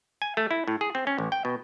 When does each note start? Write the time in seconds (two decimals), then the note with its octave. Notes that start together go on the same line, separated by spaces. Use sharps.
0.22 G#5
0.37 A3
0.51 E4
0.68 A2
0.81 G#4
0.95 C4
1.07 C#4
1.18 A1
1.32 G5
1.45 B2